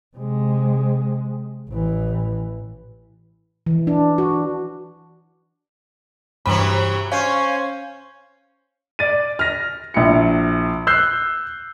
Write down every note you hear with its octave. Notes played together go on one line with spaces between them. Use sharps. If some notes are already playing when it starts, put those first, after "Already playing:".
C3 G#3
A1 E3
E3
D4
F#4
G2 C3 E3 F#3 B5
C#4 C5 F5 G#5 C#6
D5 A6 D#7
F6 A#6
A#1 E4 C#7
E6 F#6 G6 C7